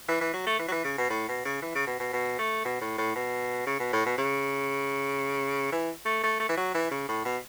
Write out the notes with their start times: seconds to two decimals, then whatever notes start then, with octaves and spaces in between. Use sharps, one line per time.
0.08 E3
0.21 E3
0.34 F#3
0.47 A3
0.59 E3
0.68 F#3
0.72 E3
0.85 C#3
0.98 B2
1.10 A2
1.28 B2
1.45 C#3
1.62 E3
1.75 C#3
1.87 B2
2.00 B2
2.13 B2
2.39 A3
2.65 B2
2.81 A2
2.98 A2
3.16 B2
3.66 C#3
3.79 B2
3.93 A2
4.06 B2
4.18 C#3
5.72 E3
6.05 A3
6.23 A3
6.40 A3
6.49 E3
6.57 F#3
6.75 E3
6.91 C#3
7.08 A2
7.25 B2